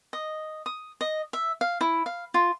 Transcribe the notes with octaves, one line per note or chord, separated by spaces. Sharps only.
D#5
D#6
D#5
E5
F5
E4
F5
F4